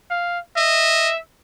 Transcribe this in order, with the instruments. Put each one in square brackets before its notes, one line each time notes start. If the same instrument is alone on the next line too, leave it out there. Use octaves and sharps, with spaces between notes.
[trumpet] F5
[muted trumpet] D#5 [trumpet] E5